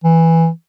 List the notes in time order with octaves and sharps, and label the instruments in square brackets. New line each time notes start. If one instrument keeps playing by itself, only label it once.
[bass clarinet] E3